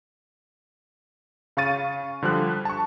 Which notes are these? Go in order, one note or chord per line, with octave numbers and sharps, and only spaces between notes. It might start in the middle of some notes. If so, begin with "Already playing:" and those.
C#3 F5 C#6 A6 D#7
D3 F3 G3 F#6
A5 C#6